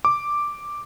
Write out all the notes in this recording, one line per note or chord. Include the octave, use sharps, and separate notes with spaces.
D6